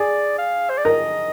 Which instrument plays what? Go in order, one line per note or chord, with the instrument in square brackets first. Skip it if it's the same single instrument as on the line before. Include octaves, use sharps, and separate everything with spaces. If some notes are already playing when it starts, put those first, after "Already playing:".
Already playing: [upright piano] G#4 [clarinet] D5
[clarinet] F5
C5
D5
[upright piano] A#4 [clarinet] D#5